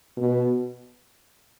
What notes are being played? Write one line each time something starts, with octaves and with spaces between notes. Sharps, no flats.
B2